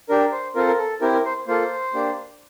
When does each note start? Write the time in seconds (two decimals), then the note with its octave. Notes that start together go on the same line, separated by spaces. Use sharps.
0.09 D4 G4 A#4
0.32 C5
0.55 C4 F4 A4 A#4
0.67 A#4
0.78 A4
1.01 C4 E4 G4 A#4
1.13 A#4
1.25 C5
1.47 A#3 F4 A4 C5
1.94 A#3 D4 G4